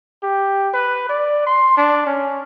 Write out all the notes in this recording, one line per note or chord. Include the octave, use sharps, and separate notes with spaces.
G4
B4
D5
C6
D4
C#4